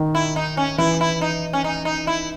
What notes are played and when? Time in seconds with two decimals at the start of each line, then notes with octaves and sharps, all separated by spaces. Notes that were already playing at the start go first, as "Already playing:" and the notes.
Already playing: D#3
0.15 E4
0.36 D#4
0.57 C#4
0.78 E3 E4
1.01 E4
1.21 D#4
1.53 C#4
1.64 D#4
1.85 D#4
2.07 E4